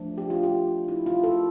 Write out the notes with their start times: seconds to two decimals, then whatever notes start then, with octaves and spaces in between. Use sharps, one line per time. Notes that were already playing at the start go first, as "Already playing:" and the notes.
Already playing: F3 A3 D4
0.18 G4
0.30 F4
0.43 G4
0.88 E4
1.06 F4
1.24 A4